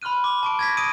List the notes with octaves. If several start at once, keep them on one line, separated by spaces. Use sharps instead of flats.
B5 C6 F6 F#6 D#7
D6
A5 C#6 D7
G#6 A#6 B6
D#6 D7 D#7